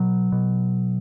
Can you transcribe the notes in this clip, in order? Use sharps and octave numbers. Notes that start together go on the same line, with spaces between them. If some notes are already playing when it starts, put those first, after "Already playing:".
Already playing: B2 F#3
B2